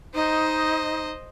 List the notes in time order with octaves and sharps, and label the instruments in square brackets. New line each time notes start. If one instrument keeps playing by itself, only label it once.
[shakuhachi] D#4 [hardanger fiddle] C5 D#5